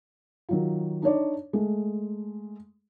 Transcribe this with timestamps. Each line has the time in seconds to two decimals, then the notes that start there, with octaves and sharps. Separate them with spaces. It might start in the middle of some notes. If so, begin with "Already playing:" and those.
0.49 D#3 F#3 F4
1.02 D4 D#4 C#5 D5
1.53 G#3 A3